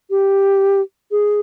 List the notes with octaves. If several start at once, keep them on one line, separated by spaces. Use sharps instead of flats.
G4
G#4